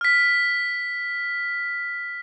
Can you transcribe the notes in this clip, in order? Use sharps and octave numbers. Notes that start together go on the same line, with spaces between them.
F6 B6